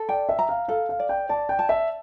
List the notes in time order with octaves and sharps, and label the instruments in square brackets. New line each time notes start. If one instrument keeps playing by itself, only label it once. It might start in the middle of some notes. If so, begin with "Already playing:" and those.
Already playing: [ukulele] A4
[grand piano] D5 [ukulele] G5
[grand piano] E5
[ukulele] A#5
[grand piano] F5
[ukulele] A4 [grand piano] F5
[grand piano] F5
[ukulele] D5
[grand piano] G5
[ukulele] D5 [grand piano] A5
[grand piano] G5
[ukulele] A5
[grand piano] E5